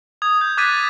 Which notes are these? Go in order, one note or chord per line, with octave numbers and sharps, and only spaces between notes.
D#6 G#6
G6
D6 F#6 G#6 A6 B6 D#7
A6